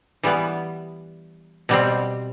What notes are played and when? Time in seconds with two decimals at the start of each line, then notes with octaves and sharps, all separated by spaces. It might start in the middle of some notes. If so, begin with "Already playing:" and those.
0.23 E3 G3 B3
1.69 B2 G3 C4